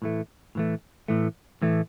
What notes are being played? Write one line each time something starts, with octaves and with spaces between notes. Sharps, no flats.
A2 E3 A3
A2 E3 A3
A2 E3 A3
A2 E3 A3